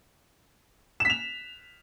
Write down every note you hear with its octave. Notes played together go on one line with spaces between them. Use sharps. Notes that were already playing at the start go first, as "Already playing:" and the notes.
B6 E7 F7